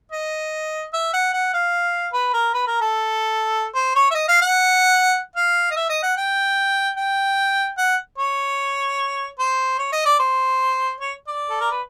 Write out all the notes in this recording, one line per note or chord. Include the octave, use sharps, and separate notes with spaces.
D#5
E5
F#5
F#5
F5
B4
A#4
B4
A#4
A4
C5
C#5
E5
D#5
F5
F#5
F5
D#5
E5
D#5
F#5
G5
G5
F#5
C#5
C5
C#5
D#5
D5
C5
C#5
D5
A4
A#4
B4